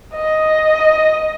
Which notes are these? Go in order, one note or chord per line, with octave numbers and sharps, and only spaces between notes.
D#5